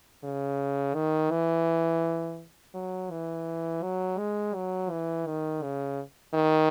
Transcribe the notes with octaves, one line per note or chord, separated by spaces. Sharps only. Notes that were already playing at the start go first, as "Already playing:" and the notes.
C#3
D#3
E3
F#3
E3
F#3
G#3
F#3
E3
D#3
C#3
D#3